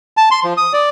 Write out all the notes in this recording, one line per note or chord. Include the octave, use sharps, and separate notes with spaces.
A5
C6
F3
D#6
D5